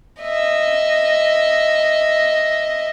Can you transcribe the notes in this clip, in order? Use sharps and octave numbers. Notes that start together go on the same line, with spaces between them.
D#5 E5